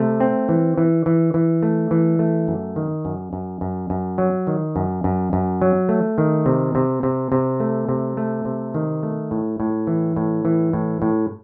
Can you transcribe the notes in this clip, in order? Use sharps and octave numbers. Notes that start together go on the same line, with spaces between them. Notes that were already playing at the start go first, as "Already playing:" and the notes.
Already playing: C3 A3
C4
E3
E3
E3
E3
A3
E3
A3
F#2
D#3
F#2
F#2
F#2
F#2
F#3
D#3
F#2
F#2
F#2
F#3
A3
D#3
C3
C3
C3
C3
A3
C3
A3
C3
D#3
A3
A2
A2
E3
A2
E3
A2
A2